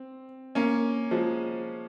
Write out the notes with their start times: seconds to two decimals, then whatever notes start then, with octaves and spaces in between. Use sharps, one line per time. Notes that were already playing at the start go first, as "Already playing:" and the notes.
Already playing: C4
0.55 A#3 C#4
1.11 F3 G#3